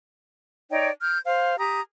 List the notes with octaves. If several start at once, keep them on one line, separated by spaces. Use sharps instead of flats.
D#4 C#5 D5 G5
F6 G6
C5 F5
G4 A#5 D#6